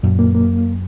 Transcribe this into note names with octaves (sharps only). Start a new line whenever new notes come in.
F#2 A#2
A#3
A#3